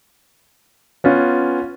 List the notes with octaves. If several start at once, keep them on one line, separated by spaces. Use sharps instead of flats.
B3 C#4 F4